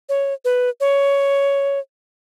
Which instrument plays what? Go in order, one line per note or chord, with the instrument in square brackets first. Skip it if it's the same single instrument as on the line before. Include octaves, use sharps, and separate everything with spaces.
[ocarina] C#5
B4
C#5